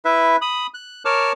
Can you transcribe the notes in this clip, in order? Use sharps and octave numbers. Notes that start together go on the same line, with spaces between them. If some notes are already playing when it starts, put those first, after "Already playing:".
E4 B4 E5
B5 D#6
F#6
A#4 C#5 A5 D6 F6